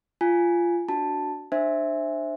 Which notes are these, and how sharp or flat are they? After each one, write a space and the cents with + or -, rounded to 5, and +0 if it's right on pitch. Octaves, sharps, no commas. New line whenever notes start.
F4 -15 G#5 +0
D4 +0 F#4 +0 A5 +0
D4 +30 C5 +10 E5 +0